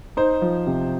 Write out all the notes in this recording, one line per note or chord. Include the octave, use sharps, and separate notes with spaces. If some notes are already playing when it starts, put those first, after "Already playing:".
D#4 C5
F3
C3